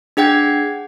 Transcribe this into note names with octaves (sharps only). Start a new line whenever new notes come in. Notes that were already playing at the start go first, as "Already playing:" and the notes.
D4 G#4 F#5 G5 G#6